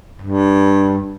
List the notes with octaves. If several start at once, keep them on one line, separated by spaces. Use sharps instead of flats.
G2